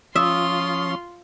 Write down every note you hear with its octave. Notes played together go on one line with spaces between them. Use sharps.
F3 C#4 F4 E5 C6 D#6